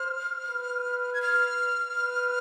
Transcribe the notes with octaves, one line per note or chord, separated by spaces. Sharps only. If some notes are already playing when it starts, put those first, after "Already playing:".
Already playing: C5 F6
B4
G#6
F6
B4